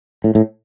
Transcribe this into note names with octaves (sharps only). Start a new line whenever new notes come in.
A2
A2